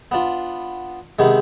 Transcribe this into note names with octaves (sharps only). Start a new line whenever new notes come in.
B3 D4 F4
C3 D#3 G#3 B3